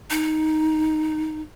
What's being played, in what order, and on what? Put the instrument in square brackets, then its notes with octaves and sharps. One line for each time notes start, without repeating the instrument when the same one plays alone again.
[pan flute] D#4